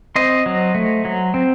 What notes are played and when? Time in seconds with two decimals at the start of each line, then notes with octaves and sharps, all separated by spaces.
0.16 C4 C5 D#5
0.46 F#3
0.75 A3
1.05 F#3
1.34 C4